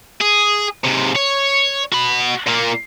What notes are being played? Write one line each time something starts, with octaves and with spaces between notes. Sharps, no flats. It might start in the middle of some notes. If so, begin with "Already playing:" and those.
G#4
G#2 C3
C#5
F#4 B5
A#2 A#3